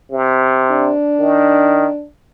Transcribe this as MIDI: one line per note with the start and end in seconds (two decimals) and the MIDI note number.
0.11 0.91 48
0.71 2.05 62
1.19 1.87 51